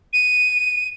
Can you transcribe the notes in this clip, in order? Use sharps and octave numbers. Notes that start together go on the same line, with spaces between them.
D#7